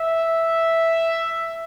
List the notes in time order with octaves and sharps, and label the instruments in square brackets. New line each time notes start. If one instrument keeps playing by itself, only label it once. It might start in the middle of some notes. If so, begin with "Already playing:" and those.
Already playing: [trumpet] E5